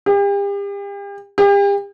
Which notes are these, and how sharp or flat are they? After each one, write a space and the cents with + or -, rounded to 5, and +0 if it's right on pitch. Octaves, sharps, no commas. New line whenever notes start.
G4 +40
G4 +40